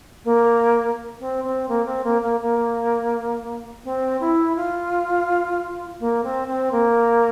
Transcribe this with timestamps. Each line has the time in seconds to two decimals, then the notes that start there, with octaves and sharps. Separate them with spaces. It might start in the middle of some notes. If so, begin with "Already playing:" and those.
0.24 A#3
1.19 C4
1.44 C4
1.68 A#3
1.85 C4
2.03 A#3
2.21 A#3
2.40 A#3
3.84 C4
4.20 E4
4.55 F4
5.99 A#3
6.23 C4
6.47 C4
6.71 A#3